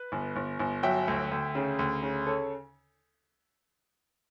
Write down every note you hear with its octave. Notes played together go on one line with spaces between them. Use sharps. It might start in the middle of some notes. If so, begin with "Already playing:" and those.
Already playing: B4
G1
G1
G1
F#3 E5 G5
D2
D2
C#3
D2
C#3
A4 C#5